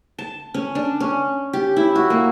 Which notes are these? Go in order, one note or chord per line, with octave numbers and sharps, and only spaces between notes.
A5
C#4
D4
C#4
G4
E4
F#4
A#3